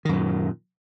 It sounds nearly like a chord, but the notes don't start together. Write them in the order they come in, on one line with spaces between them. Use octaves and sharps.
D#3 F#2 A#2